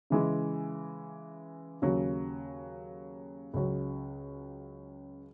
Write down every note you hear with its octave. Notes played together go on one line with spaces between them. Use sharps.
C#3 E3 G#3
D#2 C#3 F#3
C#2 C#3 F#3